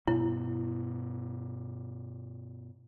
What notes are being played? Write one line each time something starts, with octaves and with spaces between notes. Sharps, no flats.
G2 B2 B3 E4